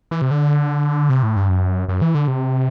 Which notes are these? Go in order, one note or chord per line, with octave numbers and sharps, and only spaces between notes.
E3
C3
D3
C3
A2
G2
F#2
F#2
E3
D3
C3